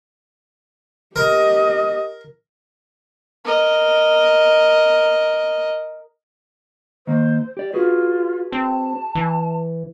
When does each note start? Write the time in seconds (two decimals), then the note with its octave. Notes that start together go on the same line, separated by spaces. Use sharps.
1.16 G4 A#4 D#5
3.45 A#4 D#5
7.07 D#3 A#3 C5
7.57 G4 D5
7.73 F4 F#4 G#4 B4
8.52 C4 A5
9.15 E3